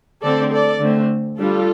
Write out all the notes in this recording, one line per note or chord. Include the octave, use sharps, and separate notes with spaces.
D3 A3 C4 A4 D5
A4 D5
D3 A3 C4
G3 D4 F4 A4